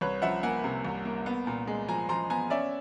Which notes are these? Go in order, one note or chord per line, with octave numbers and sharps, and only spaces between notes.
C2 B4 C#5
F3 E5 F#5
A#3 F#5 G#5
C3
C2
A#3
B3
A#2
G#3
F3 G#5 A#5
F3 A#5 C6
B3 G#5 A#5
C#4 D5 E5